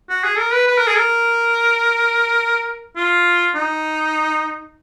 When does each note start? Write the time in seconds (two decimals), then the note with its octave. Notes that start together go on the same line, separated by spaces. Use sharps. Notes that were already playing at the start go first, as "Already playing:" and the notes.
0.10 F#4
0.24 G#4
0.38 A#4
0.53 B4
0.67 B4
0.78 A#4
0.87 G#4
0.97 A#4
2.97 F4
3.55 D#4